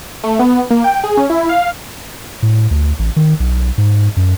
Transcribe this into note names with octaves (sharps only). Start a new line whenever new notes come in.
A3
B3
A#3
G5
G#4
C#4
E4
F5
A2
D2
A1
D#3
B1
G#2
F#2